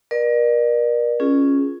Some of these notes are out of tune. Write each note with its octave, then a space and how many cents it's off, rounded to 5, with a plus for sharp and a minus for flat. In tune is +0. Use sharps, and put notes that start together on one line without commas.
A#4 +35 D5 +35
C#4 +0 F4 -5 G#4 +5